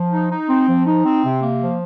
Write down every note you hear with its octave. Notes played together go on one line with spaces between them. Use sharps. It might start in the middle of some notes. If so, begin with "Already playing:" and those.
Already playing: F3
D#4
D#4
C4
F3
D#4
C4
C3
A#3
F3